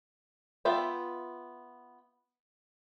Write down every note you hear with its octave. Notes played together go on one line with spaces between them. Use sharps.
B3 F4 E5 G5